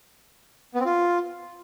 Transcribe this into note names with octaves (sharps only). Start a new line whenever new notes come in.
B3
C4
F4